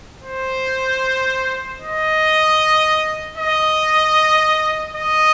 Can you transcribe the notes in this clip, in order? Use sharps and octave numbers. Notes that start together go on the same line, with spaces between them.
C5
D#5
D#5
D#5